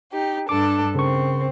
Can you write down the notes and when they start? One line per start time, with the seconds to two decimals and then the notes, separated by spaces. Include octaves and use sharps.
0.13 D#4 G4
0.49 G2 D4 A4 D6
0.95 C#3 C4 A#4 C#6